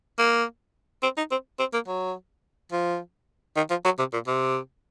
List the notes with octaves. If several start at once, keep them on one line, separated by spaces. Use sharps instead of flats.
A#3
C4
D#4
C4
C4
A#3
F#3
F3
D#3
F3
F#3
C3
A#2
C3